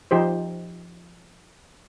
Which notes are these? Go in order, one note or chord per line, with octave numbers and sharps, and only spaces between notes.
F3 D#4 G4 C5